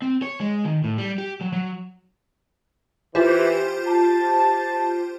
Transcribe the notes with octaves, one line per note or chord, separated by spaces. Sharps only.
C4
C#5
G#3
D#3
A2
G3
G4
F#3
F#3
E3 F4 G4 C5
A5